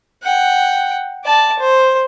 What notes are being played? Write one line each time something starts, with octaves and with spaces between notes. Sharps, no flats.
F#5 G5
D5 A5
C5